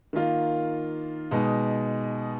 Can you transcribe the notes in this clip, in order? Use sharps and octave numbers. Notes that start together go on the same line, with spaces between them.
D#3 A#3 F4
B2 G#3 D#4